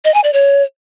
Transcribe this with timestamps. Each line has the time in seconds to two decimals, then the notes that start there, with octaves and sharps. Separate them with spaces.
0.05 D#5
0.14 G#5
0.24 D5
0.33 C#5